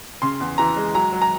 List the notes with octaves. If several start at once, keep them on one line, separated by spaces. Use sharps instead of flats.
C#3 C6
E2
E3 A#5
G#3
F#3 A#5
F#3
A#5